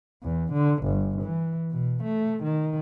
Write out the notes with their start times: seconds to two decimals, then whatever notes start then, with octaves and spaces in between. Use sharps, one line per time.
0.23 E2
0.53 D3
0.84 G1
1.22 E3
1.71 B2
2.04 A3
2.43 D#3